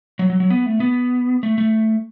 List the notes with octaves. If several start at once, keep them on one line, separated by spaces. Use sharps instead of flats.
F#3
F#3
F#3
B3
A3
B3
A3
A3